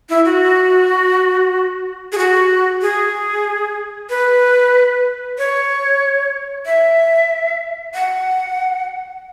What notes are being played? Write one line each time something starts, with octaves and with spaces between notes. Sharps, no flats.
E4
F#4
G#4
F#4
G#4
B4
C#5
E5
F#5